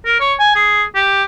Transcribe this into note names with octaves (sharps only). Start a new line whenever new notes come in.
A#4
C#5
G#5
G#4
G4